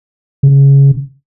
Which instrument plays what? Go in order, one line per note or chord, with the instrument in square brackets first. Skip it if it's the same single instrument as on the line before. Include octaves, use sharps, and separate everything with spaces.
[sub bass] C#3